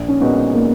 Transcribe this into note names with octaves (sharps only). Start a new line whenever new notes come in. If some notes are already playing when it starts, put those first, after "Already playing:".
Already playing: A#1
C#4
A#2 G#3 B3 D#4 F#4
A#3